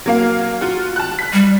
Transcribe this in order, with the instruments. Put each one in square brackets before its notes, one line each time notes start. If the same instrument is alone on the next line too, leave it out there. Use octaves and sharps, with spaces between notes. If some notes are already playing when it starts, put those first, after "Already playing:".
[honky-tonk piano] F#3 A#3 F5
F4 F#4
A5 F#6
F#6 B6
[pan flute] G3